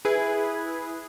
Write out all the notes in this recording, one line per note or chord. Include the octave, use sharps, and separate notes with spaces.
E4 G#4 B4